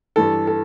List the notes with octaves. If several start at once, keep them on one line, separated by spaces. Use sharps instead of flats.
G2 E3 A4
A4